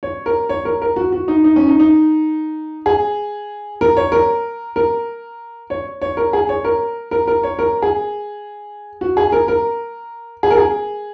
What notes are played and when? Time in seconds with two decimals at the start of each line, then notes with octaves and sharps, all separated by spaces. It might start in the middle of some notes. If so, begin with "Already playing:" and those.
0.03 C#5
0.26 A#4
0.49 C#5
0.65 A#4
0.82 A#4
0.96 F#4
1.12 F#4
1.28 D#4
1.44 D#4
1.56 C#4
1.68 D#4
1.80 D#4
2.86 G#4
3.81 A#4
3.97 C#5
4.12 A#4
4.76 A#4
5.70 C#5
6.02 C#5
6.17 A#4
6.33 G#4
6.49 C#5
6.65 A#4
7.11 A#4
7.27 A#4
7.43 C#5
7.59 A#4
7.82 G#4
9.01 F#4
9.17 G#4
9.32 A#4
9.48 A#4
10.43 G#4
10.51 A#4
10.57 G#4